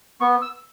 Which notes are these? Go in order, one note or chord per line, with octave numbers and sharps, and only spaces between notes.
B3 C#6
E6